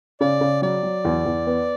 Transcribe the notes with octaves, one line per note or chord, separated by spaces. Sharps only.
C#3 D5
C#3
F#3 D5
F#3
E2
E2
B3